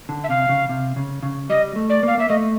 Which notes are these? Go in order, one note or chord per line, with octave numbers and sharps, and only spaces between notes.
D3
E5
C3 F5
C#3
C3
C#3
C#3
G3 D#5
A3
D5
A#3 F5
A#3 E5
A3 D#5